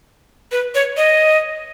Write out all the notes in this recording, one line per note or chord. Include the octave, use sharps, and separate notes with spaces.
B4
C#5
D#5